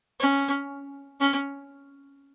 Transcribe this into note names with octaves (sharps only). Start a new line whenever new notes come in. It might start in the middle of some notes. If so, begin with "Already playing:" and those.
C#4
C#4